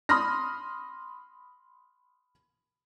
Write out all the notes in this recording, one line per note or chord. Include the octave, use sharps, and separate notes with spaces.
B5 C6 D#6 F6 A#6